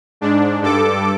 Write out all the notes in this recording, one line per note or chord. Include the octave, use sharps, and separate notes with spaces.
G#2 D4
G2 A4 D6